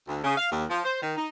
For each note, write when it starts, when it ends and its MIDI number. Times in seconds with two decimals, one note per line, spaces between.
0.08 0.24 38
0.24 0.36 49
0.38 0.50 77
0.52 0.65 39
0.70 0.81 53
0.85 0.99 72
1.02 1.16 51
1.17 1.28 63